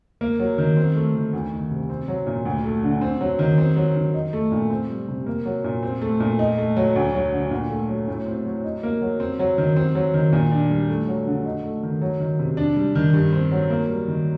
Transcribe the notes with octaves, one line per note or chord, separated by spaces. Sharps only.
A#3
F#3
D#3
C4
A3
D#3
D2
D#3
C3
C4
F#3
A#2
D2
A3
D3
C4
F#3
D#3
C4
F#3
D#3
D#4
A3
A#2
C4
G3
C3
A#3
F#3
A#2
C4
A3
A#2
D#4
A3
F#3
D2
F#3
D3
A#2
A3
F#3
A2
C4
F#3
D#4
A#3
F#3
C4
F#3
D#3
C4
F#3
D#3
A#2
D4
G3
A3
F#3
D3
D#4
A3
D#3
F#3
D#3
C3
D4
G3
D#3
G2
C4
F#3
A#3
G3
D#3